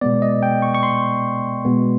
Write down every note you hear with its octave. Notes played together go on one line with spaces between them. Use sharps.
B2 G#3 B3 D5
D#5
G5
C#6
C#6
C6
B2 G#3 B3